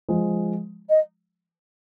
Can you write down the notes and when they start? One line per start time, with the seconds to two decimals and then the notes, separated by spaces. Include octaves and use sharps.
0.09 F3 G#3
0.89 D#5